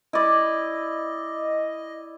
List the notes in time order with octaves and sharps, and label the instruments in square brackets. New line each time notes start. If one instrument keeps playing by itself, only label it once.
[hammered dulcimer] E4 D5 [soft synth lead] D#5